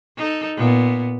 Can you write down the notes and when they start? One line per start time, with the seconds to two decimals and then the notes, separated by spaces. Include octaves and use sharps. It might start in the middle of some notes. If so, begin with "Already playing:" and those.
0.17 D#4 A4
0.57 A#2 B3